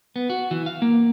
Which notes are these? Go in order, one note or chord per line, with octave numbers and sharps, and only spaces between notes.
B3
F#4
E3
F5
A#3